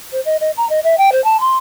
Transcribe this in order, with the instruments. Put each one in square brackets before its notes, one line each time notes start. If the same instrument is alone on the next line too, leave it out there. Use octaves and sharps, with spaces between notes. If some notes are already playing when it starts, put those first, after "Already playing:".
[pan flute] C5
D#5
D#5
A#5
D#5
E5
G5
C5
A5
C6